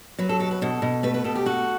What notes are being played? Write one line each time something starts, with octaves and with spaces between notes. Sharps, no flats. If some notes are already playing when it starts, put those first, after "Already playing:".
F#3 B4
A4
B2 A4
B4
B2 A4
B2
A3 B4
B4
B2 A4
G4
A3 F#4